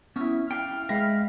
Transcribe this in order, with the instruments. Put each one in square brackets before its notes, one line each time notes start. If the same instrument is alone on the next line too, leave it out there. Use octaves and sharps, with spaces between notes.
[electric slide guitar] B3 [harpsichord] C#4 E4
[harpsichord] G3 [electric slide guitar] F5 G5 [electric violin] F6
[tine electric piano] G#3 G5 A#6 [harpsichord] B4 B5 [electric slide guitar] E5 F5